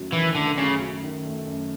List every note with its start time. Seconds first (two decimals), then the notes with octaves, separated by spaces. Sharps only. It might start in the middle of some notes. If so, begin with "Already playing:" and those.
Already playing: F#2 D#3 F#3 A3
0.13 D#3 E3
0.35 D3 A3
0.58 F#2 C#3
0.80 F#3
1.03 D#3
1.25 A3
1.47 F#2